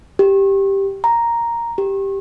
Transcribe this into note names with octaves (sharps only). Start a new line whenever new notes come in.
G4
A#5
G4